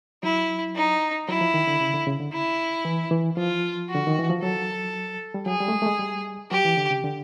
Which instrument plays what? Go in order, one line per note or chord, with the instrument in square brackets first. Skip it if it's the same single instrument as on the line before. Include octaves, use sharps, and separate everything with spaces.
[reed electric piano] F#3 [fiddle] E4
[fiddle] D#4
[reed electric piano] F#3 [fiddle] E4
[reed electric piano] F3
D#3
D3
C#3
D3
C#3
D3
[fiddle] E4
[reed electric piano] E3
E3
[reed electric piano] F3 [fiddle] F4
[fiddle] F#4
[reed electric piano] D3
D#3
E3
F3
[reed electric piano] F#3 [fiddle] A4
[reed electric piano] G3
[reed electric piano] F#3 [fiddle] G#4
[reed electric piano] G3
A3
G#3
A3
G#3
G3
[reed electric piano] F#3 [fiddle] G4
[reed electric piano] E3
D3
C#3
D3